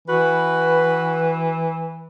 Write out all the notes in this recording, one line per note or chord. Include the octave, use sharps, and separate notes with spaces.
E3 F#4 B4